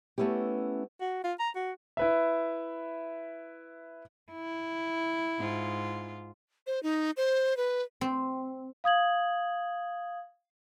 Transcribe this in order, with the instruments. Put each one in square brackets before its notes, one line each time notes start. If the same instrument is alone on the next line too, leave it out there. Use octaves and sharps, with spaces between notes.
[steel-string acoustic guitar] A3 B3 C#4 E4 G4
[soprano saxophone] F#4
F4
A#5
F#4
[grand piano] E4 B4 E5
[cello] E4
[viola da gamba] G#2 F4
[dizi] C5
D#4
C5
B4
[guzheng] C4
[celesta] F5 D#6 G#6 F#7